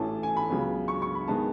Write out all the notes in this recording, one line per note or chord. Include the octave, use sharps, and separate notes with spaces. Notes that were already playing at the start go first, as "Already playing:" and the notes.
Already playing: A1 A2 E3 A3 C#4 A5
G#5
B5
C#2 C#3 F#3 B3
C#6
C#6
B5
D#3 G#3 B3 A5